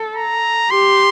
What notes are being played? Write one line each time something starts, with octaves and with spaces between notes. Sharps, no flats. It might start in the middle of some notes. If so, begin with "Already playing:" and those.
Already playing: A4
A#5
G4 C6